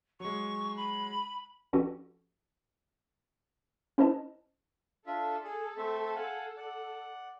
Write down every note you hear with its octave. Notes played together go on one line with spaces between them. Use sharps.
F#3 G#3 C#6
B5
F3 C#4 F#4 G4 A4 B4
C#4 E4 B4 C5 D#5 A5
D4 F4 A4 E5
G#4
A3 C4 E5
F5 F#5 G#5
D5 F#5